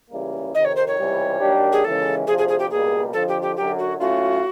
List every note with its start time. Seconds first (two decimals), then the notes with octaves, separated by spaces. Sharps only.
0.11 C#2 C#3 E3 G3 A#3
0.55 F2 C3 D#3 D#5
0.65 C#5
0.76 C5
0.87 C#5
0.97 C#2 C3 E3 G3
1.40 D#3 F#3 A#3 D4 G4
1.72 G#4
1.84 D#2 C#3 E3 G#3 A4
2.27 D2 C3 F3 G#4
2.38 G#4
2.48 G#4
2.59 G4
2.71 C#2 B2 G3 A#3 G#4
3.13 F2 D3 F3 A4
3.28 G4
3.42 G4
3.56 F#2 D3 F#3 G4
3.79 F#4
4.00 A2 F#3 A3 C#4 F4 F#4